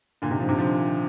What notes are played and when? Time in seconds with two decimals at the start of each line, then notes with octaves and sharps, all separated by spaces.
0.22 A#2 D3
0.31 C3 D#3
0.40 D3 F3
0.49 C3 D#3
0.58 D3 F3